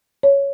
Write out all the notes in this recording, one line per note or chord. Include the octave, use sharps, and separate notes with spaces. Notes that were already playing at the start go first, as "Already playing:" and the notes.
C#5